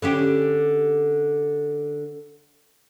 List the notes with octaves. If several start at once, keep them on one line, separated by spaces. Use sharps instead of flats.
D3 C#4 G4